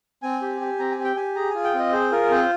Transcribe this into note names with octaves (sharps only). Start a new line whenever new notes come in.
C4 G#5
G4
G4
C4 A#5
G#5
G4
G5
G4 G#5
G#4 A#5
F4 G#5
G5
C4 D#5
G#4 C5
F4 A#4
C4 C5